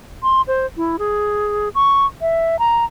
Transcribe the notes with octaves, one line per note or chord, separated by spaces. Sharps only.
C6
C5
E4
G#4
C#6
E5
A#5